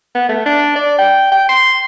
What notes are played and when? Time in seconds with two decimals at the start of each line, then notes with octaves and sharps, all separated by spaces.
0.15 B3
0.29 A3
0.46 D4
0.76 D5
0.98 G5
1.32 G5
1.49 C6